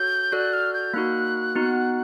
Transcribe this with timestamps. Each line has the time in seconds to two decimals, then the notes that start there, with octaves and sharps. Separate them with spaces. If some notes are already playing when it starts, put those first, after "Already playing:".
Already playing: F#4 A4 C#5 G6
0.32 F#4 A4 D5 F#6
0.53 F6
0.74 G6
0.94 A#3 D#4 F#4 F#6
1.55 B3 D#4 F#4